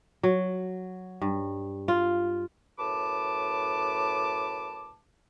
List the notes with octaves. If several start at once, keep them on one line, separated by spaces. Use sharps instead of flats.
F#3
G2
F4
F#2 A2 B4 A5 D6